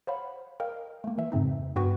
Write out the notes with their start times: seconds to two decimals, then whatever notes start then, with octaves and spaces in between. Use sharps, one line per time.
0.07 C5 C#5 F5 F#5 B5
0.60 A#4 D#5 F5 G5
1.04 A3 A#3
1.18 E3 E5
1.32 F2 G#2 C#3 C4 D#4
1.76 G2 B3 F#4 B4 G5 C#6